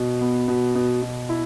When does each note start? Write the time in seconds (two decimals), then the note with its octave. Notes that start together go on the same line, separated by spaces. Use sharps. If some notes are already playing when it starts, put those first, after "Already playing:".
Already playing: B2
0.21 B3
0.48 B2
0.75 B2
1.02 B2
1.29 E4